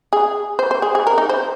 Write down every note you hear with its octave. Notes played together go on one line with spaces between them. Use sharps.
G#4
C5
C5
G#4
G#4
A#4
D#4
C5